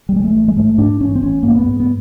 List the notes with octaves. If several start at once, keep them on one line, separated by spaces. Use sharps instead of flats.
G3
A1 G#3
A3
A1
G#3
G#2 A3
G#2 D4
A1 C#4
C4
A1 C#4
G#2 A#3
B3
G#2
B3